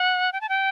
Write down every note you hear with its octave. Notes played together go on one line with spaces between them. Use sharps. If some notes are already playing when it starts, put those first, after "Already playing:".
Already playing: F#5
G5
A5
G5